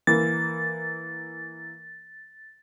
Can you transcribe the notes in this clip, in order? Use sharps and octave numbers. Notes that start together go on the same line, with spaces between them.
E3 A#3 A6